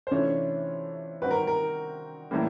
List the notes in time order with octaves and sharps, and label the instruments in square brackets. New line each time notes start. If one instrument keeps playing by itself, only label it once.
[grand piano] C5
[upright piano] C3 E3 A3 D4 F4 [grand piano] C#4 C#5
[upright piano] D#3 G3 C4 D#4 F#4 [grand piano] B4
[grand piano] A#4
A#4
[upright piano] A2 E3 G3 A#3